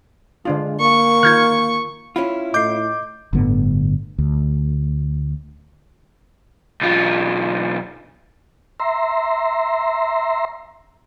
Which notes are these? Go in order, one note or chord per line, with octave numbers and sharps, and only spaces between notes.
D3 G#3 D4 F4
A#3 C#6
D#3 F4 F6 G6 G#6
C#4 E4 F4 B5
A2 D#5 D6 G6 C7
G1 A2 D3 B3
D2
B1 F4
E5 A#5 C6